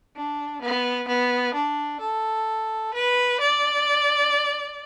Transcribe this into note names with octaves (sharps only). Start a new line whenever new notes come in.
D4
B3
B3
D4
A4
B4
D5